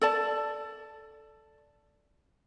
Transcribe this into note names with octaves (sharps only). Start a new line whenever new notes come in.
A4 D5 A5